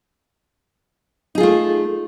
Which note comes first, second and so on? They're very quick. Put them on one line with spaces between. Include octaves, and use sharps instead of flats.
D#4 G#4 F4 A3